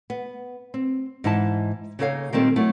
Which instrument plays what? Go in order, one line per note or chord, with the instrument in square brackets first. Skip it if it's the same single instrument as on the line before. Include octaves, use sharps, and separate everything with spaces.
[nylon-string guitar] B3
C4
G#2 E3 D#4 E4 A5
C#3 A#3 D#4 A4 C#5 F5
A#2 D#3 G3 A#3 C4 A4
F#3 A3 E4